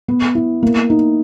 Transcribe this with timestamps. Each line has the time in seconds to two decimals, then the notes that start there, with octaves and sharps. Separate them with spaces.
0.08 B3
0.35 E4
0.63 A#3
0.90 D#4